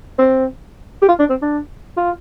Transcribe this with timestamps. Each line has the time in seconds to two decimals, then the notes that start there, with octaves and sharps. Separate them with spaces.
0.19 C4
1.02 G4
1.09 F4
1.19 D4
1.30 C4
1.42 D4
1.97 F4